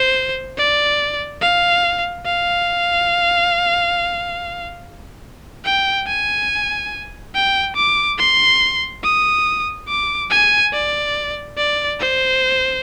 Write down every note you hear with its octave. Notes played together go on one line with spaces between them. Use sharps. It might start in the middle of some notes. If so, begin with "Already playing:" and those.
Already playing: C5
D5
F5
F5
G5
G#5
G5
D6
C6
D#6
D6
G#5
D5
D5
C5